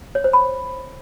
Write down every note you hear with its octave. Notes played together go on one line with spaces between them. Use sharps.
C#5
C5
B5